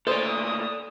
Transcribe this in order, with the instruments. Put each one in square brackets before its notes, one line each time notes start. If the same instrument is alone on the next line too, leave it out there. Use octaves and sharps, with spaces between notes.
[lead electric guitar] A#2 A3 [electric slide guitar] A4 D5 [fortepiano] C5 [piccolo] D#6